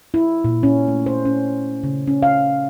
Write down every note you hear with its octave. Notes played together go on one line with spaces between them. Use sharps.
E4
A#2
C#4
A3
C5
C#4
C#3
C#4
F5